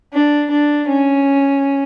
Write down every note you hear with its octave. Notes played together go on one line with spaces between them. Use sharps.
D4
D4
C#4